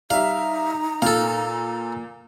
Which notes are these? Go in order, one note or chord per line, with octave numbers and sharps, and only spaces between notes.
G3 D#4 E5 F5 A#5
A#2 A4 F5